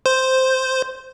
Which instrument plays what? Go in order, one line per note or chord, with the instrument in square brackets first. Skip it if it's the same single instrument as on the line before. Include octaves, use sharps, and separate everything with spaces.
[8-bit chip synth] C5